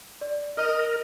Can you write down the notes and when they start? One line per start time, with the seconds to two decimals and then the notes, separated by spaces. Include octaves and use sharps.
0.21 D5
0.57 A#4 D#5 F6